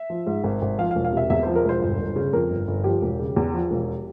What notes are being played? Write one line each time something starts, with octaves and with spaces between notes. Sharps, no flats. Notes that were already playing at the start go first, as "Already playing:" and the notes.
Already playing: E5
F3
G#2
G#1
G#1
F3 F5
E1 F5
F5
C3 E5
E2 E5
F3 C5
A#4
E1 C5
G1
G1
C#3
F2 A#4
G1
G1
F3 G4
E1
C#3
E2
F3
E1